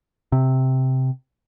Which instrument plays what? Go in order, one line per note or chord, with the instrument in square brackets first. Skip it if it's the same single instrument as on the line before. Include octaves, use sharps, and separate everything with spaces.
[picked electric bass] C3